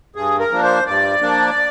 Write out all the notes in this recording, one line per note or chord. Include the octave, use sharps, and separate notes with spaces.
G2 G#4
A#4
F3 A#3 D4
C5
G2 D5
F3 A#3 D4